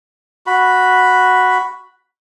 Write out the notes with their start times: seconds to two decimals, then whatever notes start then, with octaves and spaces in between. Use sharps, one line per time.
0.47 F#4 B5